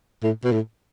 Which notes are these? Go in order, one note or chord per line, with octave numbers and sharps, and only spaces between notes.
A2
B2
A2